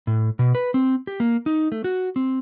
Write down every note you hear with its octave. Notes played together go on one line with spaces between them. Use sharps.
A2
B2
B4
C4
G4
A#3
D#4
A3
F#4
C4